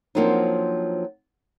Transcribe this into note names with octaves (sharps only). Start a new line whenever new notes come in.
F3 F#3 A#3 C4 D4 D#4